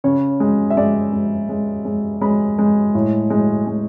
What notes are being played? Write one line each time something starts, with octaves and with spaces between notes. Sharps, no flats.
C#3 C#5
G#3
E5
G#3 D5
G#3
G#3
G#3
G#3 B5
G#3
A2
G#3
G#3